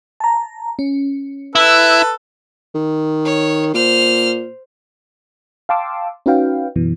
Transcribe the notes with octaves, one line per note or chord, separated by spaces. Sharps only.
A5 A#5
C#4
E4 A4 B4
D#3
C#5
A#2 C5 F6
F5 G5 A5 C6 D6 E6
C#4 D#4 F#4 B4 F5 G5
F#2 B2 E3